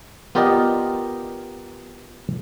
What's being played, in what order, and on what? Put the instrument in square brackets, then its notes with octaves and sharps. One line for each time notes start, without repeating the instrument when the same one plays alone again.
[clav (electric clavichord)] B3 F4 G4 A#4 D5 D#5